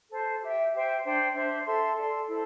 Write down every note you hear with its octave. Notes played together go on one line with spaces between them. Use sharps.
A4 C5 A5
G4 E5 G5
G4 C5 E5 G5
D4 C5 G5
D4 C5 E5
A4 E5 C6
A4 D5 C6
E4 A4 C5